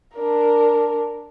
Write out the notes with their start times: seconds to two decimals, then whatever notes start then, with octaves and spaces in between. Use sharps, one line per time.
0.15 D4 A#4